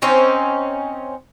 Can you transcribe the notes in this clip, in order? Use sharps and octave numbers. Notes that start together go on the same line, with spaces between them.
C4 C#4 D#4 C5